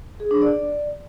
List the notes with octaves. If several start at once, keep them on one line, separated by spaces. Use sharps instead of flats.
G#4
D4
D5